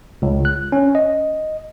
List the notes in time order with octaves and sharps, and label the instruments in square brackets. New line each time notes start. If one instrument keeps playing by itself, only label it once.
[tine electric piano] C#2
F#6
C#4
D#5